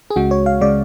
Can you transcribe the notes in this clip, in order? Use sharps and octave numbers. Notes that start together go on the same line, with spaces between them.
G#4
C#2 C#3 G#3 F#4
C#5
F5
C#3 G#3 D5